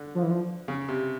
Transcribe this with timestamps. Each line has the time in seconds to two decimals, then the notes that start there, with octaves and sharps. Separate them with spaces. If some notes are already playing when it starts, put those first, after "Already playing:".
Already playing: D3
0.15 F3
0.23 E3
0.31 F3
0.68 C#3
0.88 C3